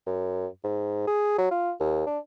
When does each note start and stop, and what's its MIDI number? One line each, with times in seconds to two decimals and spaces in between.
0.07 0.47 42
0.64 1.05 44
1.07 1.37 68
1.38 1.48 54
1.51 1.72 65
1.80 2.06 39
2.07 2.19 62